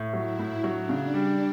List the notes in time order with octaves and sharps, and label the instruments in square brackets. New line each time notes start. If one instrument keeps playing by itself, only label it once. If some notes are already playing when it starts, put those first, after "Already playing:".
Already playing: [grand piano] A2
[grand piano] F#3 [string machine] E4
[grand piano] A2
[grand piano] F#3 [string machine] D4
[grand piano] C#3
G3